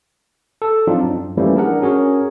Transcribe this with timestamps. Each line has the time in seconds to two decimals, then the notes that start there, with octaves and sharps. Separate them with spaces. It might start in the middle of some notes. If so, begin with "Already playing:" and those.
0.62 A4
0.87 F3 F#3 C4 D4 D#4 F4
1.03 F#2
1.37 E3 F3 G3 A3 A#3 C#4
1.56 D4 G#4 A#4 F#5
1.81 C#4 F#4 G#4 A#4 C#5